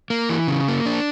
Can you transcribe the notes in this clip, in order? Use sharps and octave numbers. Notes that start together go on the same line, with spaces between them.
A#3
E3
C#3
A#3
D4